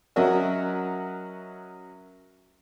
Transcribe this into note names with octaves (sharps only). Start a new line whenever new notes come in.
F#3 C#4 F#4 A#4 D#5 E5